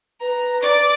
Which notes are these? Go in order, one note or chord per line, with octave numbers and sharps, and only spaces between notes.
B4 A#5
D5 D6